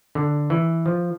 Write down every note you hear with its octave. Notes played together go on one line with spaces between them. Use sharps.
D3
E3
F3